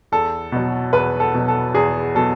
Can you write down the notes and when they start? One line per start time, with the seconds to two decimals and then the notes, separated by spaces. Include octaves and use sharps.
0.12 E2 A4
0.52 B2 F#3
0.93 E2 B4
1.20 A4
1.34 B2 F#3
1.48 A4
1.74 E2 G#4
2.15 B2 F#3 A4